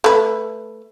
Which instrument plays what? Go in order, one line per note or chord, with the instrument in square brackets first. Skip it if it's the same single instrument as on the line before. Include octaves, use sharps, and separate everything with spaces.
[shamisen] A3 B4